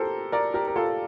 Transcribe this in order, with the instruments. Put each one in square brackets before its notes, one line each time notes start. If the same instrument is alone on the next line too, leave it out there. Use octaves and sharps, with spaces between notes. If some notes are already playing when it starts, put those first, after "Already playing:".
Already playing: [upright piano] G4 A4 A#4 C5
A#4 D5
G4 A#4
A#4
F4 A4